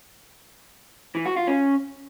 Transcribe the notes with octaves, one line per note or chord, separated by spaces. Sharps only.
E3
F#4
F4
C#4